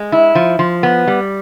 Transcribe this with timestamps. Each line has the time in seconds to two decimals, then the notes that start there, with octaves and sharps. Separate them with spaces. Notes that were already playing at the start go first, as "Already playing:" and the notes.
Already playing: G#3
0.12 E4
0.35 F3
0.59 F3
0.83 B3
1.07 G3